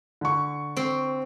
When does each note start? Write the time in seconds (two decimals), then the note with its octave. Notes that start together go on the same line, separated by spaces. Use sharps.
0.21 D3 C#6
0.77 C4